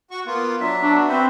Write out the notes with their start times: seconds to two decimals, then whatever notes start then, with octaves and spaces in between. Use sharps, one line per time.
0.11 F#4 C#6
0.26 A#3 B3 F4
0.61 F#3 D4 E5
0.82 B3 D4 F#4
1.09 C4 B4 C5 E5